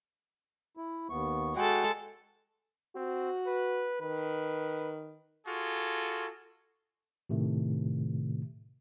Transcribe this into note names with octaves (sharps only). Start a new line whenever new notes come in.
E4
D#2 B3 C#6
G#3 F#4 A4 F#5 G5
C4 F#4
B4
D#3 B4
F4 F#4 G#4 A4
A2 C3 D#3 A3